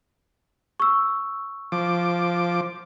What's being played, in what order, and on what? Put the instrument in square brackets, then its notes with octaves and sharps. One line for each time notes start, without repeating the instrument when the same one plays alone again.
[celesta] C#6 E6
[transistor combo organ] F3 D6